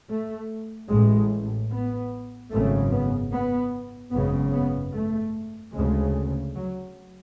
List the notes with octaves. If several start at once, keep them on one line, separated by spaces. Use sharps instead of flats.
A3
A1 A2 G#3
B3
G#1 F#2 C#3 A3
B3
B3
G#1 F#2 C#3 B3
B3
A3
D2 C#3 G#3
F#3